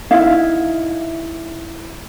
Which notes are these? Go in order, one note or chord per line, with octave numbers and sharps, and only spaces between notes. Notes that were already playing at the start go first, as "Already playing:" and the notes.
D#4 E4 E5 F5